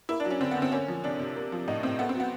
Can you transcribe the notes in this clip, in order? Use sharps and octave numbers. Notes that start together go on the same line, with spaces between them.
A#3 E4
D4
F#3
C#4
D3 C4
B3
D3
C4
A#3 C#4
F3
C3 D4
C3
A#3
F3
A2 D#4
A2 C4
A3 B3
C4
F#3
B3